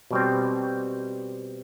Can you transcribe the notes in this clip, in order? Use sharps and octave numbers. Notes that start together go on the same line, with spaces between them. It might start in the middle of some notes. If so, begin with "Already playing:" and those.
B2 G3 C4